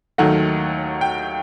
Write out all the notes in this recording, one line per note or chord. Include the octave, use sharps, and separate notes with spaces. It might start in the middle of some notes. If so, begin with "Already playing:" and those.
D#2 D#3 F#3 A3 F#5
G5